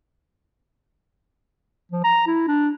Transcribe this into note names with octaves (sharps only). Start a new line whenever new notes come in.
F3
A#5
E4
D4